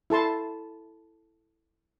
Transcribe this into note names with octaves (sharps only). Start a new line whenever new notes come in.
E4 A4 A5 C6